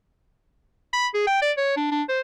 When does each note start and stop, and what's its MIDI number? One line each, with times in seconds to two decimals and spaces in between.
0.93 1.07 83
1.14 1.24 68
1.27 1.41 79
1.42 1.52 74
1.57 1.75 73
1.77 1.91 62
1.91 2.03 62
2.09 2.20 72